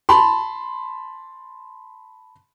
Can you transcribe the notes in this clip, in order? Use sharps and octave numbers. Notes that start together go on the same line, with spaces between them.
A5 B5 C6